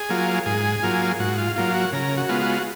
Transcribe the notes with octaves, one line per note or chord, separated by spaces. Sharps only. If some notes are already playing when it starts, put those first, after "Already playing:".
Already playing: G#4
F#3 A#3 F4
G#2 G#4
F#3 A#3 F4
G#2 F#4
F4
F#3 A#3 F4
F#4
C#3 A#4
F#4
G#3 B3 F4
F#4